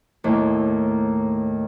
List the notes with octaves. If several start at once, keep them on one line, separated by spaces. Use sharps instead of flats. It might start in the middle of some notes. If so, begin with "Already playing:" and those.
D#2 A2